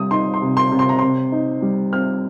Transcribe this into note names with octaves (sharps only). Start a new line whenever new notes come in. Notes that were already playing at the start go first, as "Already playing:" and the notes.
Already playing: C3 G3 D#6
D#4 C6
C6
C3
C6
C3
C6
A#5
C3 C6
D#4
G3
C4 F6